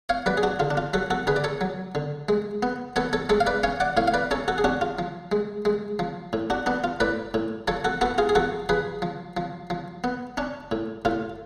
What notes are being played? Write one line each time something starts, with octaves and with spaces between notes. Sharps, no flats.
C#5 F5
F#3 B4 D5
G#4
D4 F#4
D3 F4
D4
F4
F#3 F#4 A4
F#4 A4
D3 G#4 B4
D5
A4 C#5
F#3
D3
G#3
B3
B3 A4 C#5
A4 C#5
G#3 A4 C#5
F5
B4 D5
C#4 C#5 F5
D5 F#5
A2 C#5 F5
F5
B4 D5
C#4 A4 C#5
F#4 A4
G#4
C#4 D4 F#4
F4
F3
G#3
G#3
F3
A2
D4 F#4
B3 D4
F4
A2 B4 D5
A2
F3 A4 C#5
F#4 A4
B3 F#4 A4
F4 G#4
G#4
F3 F#4 A4
F3 G#4 B4
F3
F3
F3
B3
C#4 D4
A2
A2 F4